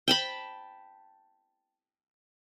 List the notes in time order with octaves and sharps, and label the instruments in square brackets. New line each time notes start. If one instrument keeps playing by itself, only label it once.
[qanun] G5 A5 B5